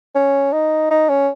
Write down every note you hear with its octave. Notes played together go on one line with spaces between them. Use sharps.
C#4
D#4
D#4
C#4